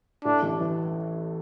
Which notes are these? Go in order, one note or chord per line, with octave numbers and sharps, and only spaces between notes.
A2 D4
A1
E3